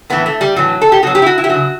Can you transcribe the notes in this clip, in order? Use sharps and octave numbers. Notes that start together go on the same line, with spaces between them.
A2 E3 B3
A3
G3
A2 E3 F#3
A4
G4
B2 F#3 F#4
G4
E4
F#4
E4
G4
C#3 F#3 F#4